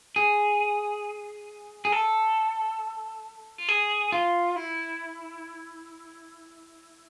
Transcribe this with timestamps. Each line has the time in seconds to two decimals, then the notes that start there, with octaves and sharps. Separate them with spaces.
0.16 G#4
1.85 G#4
1.92 A4
3.58 F4
3.69 G#4
4.12 F4
4.56 E4